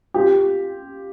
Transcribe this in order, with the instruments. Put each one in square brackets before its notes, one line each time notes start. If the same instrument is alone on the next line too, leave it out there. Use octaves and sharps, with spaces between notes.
[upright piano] F4 G4